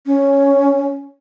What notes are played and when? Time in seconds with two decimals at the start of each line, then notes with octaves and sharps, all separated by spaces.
0.06 C#4